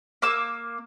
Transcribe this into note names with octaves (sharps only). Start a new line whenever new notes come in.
A#3 D6 E6